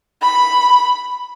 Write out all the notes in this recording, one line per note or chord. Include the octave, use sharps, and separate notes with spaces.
B5